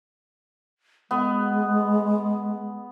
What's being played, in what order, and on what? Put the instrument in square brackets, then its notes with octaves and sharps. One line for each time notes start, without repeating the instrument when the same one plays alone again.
[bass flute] G#3 [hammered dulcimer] B3